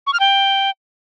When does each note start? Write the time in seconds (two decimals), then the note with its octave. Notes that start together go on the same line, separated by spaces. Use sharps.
0.07 C#6
0.13 F6
0.20 G5